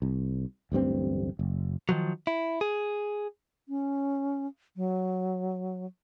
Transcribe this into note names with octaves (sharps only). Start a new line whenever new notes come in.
C2
D1 A1 G2 C4
F#1
D#3 F3 F#3
E4
G#4
C#4
F#3